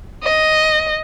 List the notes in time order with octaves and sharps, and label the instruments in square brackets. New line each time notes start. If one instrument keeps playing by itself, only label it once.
[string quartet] D#5